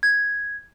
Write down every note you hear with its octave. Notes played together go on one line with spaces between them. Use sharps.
G#6